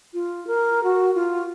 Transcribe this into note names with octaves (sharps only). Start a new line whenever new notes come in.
F4
A#4
F#4
F4